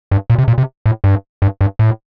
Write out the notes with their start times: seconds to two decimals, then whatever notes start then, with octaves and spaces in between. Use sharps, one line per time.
0.11 G2
0.30 A#2
0.38 C3
0.48 A#2
0.58 C3
0.86 A2
1.04 G2
1.42 G2
1.61 G2
1.79 A2